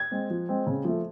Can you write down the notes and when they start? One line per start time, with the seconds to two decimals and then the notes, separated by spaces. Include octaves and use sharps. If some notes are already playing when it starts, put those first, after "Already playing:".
Already playing: G#6
0.11 G#3 C4
0.30 F3
0.49 G#3 C4
0.67 C#3
0.84 F3 A3